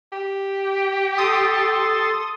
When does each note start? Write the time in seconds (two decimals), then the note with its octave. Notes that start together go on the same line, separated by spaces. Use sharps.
0.12 G4
1.18 A4 C6 D#6 A6